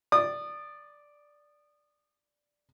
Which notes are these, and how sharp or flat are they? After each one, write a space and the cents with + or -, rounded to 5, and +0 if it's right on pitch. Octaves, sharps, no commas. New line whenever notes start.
D5 +0 D#6 -25